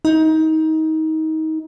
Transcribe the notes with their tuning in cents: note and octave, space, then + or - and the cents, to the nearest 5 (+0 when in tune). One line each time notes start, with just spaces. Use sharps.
D#4 +25